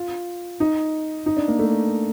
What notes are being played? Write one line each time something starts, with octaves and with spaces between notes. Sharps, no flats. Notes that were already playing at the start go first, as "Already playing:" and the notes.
Already playing: F4
D#4
D#4
D4
A#3
A3